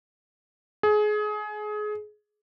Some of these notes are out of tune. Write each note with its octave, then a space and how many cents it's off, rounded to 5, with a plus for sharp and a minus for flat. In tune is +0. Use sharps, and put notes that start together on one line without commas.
G#4 +25